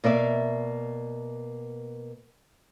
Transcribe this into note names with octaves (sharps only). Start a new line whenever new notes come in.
B2 A#3 D5 E5